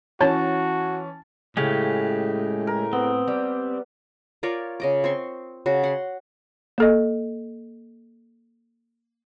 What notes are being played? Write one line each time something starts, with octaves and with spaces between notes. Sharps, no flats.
E3 C#4 F#4 C#5 A5
A2 C#3 G#3 G4 F5
A#4
B3 C4
G3
F4 A#4 C#5 D5
C#3 D#5 D6
C4 C6 C#6
C#3 F#4
F#5 C6
A#3 A4 D#5